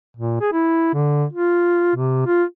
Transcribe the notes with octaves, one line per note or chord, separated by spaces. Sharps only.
A#2
G#4
E4
D3
F4
C3
F4